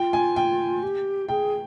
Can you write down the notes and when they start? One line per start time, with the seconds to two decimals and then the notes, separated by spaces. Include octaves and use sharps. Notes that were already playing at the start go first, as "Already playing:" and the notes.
Already playing: F4 G5
0.13 G#5
0.36 G5
0.83 G4
1.29 G#4 G5